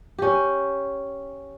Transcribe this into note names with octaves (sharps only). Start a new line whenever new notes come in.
C#4 G4